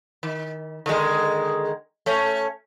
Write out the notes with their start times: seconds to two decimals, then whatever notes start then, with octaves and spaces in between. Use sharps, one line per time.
0.23 D#3
0.86 D3 D#3 G#3
2.06 A3 C#4